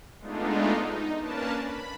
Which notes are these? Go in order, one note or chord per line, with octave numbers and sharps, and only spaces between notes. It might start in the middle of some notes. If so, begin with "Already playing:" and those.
G#3 A3 B3 D4 D#4 F4
D#4
A#3 C#4 D4 A#4 B4 A5
B5